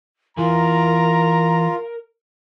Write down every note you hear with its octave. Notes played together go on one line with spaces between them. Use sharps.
E3 F4 G#4 A#4 A#5